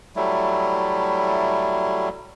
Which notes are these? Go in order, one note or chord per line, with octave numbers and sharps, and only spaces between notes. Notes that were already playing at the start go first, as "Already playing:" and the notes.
F#3 G3 A3 E4